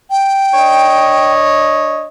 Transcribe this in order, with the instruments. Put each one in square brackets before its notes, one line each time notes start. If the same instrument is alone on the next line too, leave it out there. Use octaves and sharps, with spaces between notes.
[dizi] G5
[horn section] D4 C#5 D#5